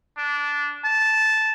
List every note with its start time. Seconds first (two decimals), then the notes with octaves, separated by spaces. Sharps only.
0.18 D4
0.84 A5